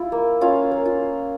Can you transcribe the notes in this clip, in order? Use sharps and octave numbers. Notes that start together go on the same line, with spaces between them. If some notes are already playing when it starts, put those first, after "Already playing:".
Already playing: E4 F4
A#3
C#4 F4 F5
A#3
F4 F5
F4